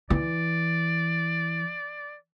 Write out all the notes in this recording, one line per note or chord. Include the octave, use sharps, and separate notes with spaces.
E3 D5